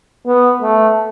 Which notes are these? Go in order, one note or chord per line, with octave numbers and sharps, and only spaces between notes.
B3
A3